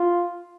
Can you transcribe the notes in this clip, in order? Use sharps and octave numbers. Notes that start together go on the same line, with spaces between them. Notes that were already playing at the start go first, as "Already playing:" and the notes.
Already playing: F4